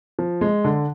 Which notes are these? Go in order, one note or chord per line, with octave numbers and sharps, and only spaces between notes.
F3
G#3
D3